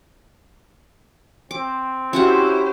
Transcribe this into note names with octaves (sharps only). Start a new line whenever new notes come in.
C4 D6
C#4 E4 F#4 G4 C5 F#5